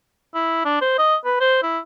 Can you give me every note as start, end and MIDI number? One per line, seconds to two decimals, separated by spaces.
0.34 0.64 64
0.65 0.80 62
0.81 0.98 72
0.98 1.15 75
1.25 1.38 71
1.40 1.59 72
1.63 1.79 64